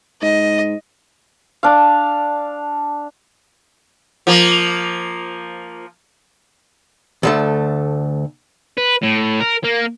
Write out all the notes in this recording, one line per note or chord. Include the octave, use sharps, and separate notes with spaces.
G#2 D#5
D4 F5
F3 A#3
D2 D3 A3
B4
A2
A#4
A#3